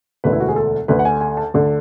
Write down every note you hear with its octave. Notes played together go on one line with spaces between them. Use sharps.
E1 D2 D3 B4
E4
F#4
G#4
A4
D2 D3 B4
F#5
G#5
G#5
A5
D2 D3